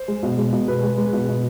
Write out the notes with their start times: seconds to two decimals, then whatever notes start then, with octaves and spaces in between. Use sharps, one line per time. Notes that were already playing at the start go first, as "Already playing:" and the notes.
Already playing: C5
0.08 G#3
0.23 B2
0.37 G#3
0.53 B2
0.68 B2 B4
0.83 G#3
0.97 G#3
1.13 B2
1.29 B2